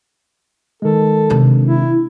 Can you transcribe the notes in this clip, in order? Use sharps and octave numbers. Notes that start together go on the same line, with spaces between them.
D#3 G#3 A4
C3 D4
E4